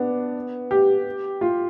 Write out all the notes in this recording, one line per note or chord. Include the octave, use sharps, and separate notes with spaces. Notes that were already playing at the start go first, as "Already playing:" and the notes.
Already playing: B3 D4
G4
F4